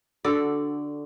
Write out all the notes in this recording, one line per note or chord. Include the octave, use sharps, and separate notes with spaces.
D3 F#4 A4 D5